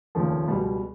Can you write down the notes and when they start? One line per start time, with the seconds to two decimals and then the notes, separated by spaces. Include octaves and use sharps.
0.15 F1 D#2 C#3 F3 A3
0.48 C#2 B2 G3